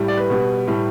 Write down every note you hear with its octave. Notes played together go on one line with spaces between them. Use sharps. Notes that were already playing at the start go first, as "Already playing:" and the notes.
Already playing: A2 G3
D5
B4
B2 G3
A2 G3